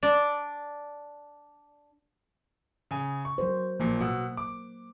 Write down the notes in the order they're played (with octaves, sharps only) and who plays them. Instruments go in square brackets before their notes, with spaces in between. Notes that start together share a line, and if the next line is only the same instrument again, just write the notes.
[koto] D4 D5
[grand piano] C#3 G#5
C#6
[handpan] F#3 A#4 C5
[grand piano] A#1 A#2 [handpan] A#3
[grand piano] B2 F#5 E6
D6